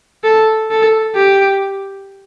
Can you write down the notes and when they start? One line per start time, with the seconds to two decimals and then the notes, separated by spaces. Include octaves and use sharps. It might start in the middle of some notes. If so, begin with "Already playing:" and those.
0.24 A4
0.71 A4
1.16 G4